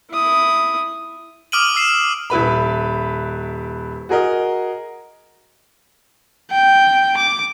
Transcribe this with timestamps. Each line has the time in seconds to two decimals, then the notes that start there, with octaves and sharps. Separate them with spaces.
0.11 E4 D#6
1.52 D6 D#6 F6 D7 D#7 F#7
1.74 D6 E6 C7 E7
2.30 D#1 E4 B4 B5
4.09 F#4 G#4 A#4 D#5
6.51 G5
7.17 D6